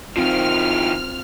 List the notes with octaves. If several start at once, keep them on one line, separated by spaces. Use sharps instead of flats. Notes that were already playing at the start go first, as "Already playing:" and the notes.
D#3 F3 C4 F4 F6